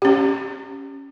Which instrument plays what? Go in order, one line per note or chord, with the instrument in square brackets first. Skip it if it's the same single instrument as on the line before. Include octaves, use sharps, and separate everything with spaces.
[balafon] C#4 G4